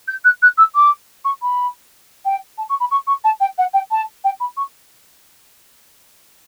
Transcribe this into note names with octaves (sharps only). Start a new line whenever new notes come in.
G6
F#6
F#6
E6
D6
C#6
B5
G5
A5
C#6
B5
C#6
C#6
A5
G5
F#5
G5
A5
G5
B5
C#6